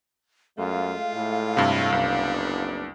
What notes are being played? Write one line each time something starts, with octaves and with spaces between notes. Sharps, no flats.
F#2 G#3 A3 F4 F5
A2
G2 C3
F#1 C2 B3 D4